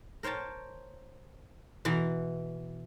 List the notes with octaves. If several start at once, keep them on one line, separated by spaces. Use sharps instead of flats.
A#4 C5 C#5 G5 A5
B2 E3 A#5 C6